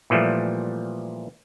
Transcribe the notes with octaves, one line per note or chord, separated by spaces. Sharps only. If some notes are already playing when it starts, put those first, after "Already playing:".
A#2 E3 F3 G3 A3